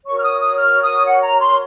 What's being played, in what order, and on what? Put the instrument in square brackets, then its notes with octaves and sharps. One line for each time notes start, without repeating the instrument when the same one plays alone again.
[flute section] F#4 A#4 C#5 C#6
F6
D#6
D#6
F6
D#6
F#5
A#5
C6